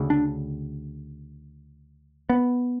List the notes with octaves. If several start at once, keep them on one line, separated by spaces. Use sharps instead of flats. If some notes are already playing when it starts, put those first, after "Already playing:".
Already playing: D2 C#3
D4
B3